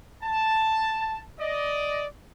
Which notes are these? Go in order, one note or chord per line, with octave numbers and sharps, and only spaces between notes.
A5
D5 D#5